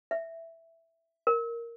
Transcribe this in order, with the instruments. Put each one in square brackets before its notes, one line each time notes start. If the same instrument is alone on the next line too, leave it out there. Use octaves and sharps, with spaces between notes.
[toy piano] E5
A#4